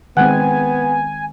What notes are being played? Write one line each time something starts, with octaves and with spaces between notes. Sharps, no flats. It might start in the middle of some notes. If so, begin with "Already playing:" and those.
D#3 G#3 B3 C4 F#5 G#5 F#6